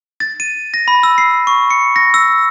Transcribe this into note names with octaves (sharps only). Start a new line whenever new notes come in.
A6
D#7
A#6
B5
E6
C7
C#6
C#7
A#6
E6